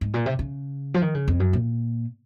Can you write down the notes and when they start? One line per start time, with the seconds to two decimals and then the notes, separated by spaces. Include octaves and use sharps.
0.01 G#2
0.14 A#2
0.26 C3
0.39 C#3
0.94 F3
1.02 D#3
1.14 C#3
1.28 F2
1.40 F#2
1.53 A#2